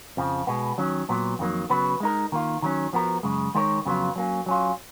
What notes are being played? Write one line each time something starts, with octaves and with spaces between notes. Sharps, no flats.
F2 C#3 F3
B2 G#3 B3
D#3 F#3 C#4
A#2 F#3 B3
F2 D#3 F#3 A#3
C#3 F#3 B3 F#4 B4
G#3 D#4 A#4
D#3 A#3 F4
D#3 F#3 C#4
F3 B3 F#4 A#4
F#2 C#3 G#3
D#3 G#3 D#4 A#4 C#5
F2 C#3 F#3 B3 F4
F#3 A#3 C#4
F#3 C#4 F4